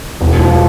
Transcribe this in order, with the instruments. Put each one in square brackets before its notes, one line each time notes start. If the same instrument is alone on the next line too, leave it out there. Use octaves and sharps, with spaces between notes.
[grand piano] E1
F3